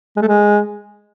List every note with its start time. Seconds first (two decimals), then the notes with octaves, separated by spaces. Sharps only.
0.16 G#3
0.22 A3
0.28 G#3